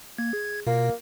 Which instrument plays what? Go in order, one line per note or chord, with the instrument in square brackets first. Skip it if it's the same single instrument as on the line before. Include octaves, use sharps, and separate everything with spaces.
[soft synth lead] A#3 [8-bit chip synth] G#6
[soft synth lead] G#4
[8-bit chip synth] B2 [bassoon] A#3 [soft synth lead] F4